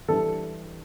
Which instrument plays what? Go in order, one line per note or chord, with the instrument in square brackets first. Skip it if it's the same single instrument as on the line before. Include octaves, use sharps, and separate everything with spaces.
[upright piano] E3 G3 D4 A4